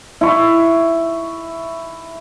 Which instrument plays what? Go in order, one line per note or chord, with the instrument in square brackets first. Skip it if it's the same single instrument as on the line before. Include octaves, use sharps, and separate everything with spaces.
[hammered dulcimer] E4 C#6